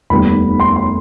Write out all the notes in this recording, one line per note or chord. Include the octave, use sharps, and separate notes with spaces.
F1 D#2 D#3 G3 B3 B5
C6
C6